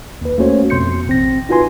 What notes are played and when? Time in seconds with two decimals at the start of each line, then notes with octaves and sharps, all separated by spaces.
0.21 D#2 B4
0.38 A3 A#3 C#4 F#4 C5 C#5
0.70 F2 B2 C6 G6 C#7
1.07 A1 C4 A#6
1.49 D#4 F4 F#4 B4 G#5 C6